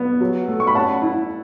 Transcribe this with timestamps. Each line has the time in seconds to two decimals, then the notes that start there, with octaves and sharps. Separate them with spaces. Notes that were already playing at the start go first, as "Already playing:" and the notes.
Already playing: B3
0.21 F#3
0.48 A3
0.60 C#6
0.67 B5
0.75 C#4 F#5 A5
1.02 E4